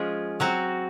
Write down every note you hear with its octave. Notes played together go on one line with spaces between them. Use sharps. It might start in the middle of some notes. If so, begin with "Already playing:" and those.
Already playing: F3 G#3 C#4 F4 G#4
F#3 C4 F#4